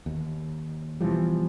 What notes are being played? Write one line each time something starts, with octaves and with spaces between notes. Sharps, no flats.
D#2
B2 E3 F3 G3